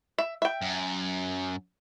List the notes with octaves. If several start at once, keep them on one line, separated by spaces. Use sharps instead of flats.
E5
E5 G5
F#2